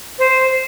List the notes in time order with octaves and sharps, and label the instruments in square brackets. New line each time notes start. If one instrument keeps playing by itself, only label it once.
[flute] C5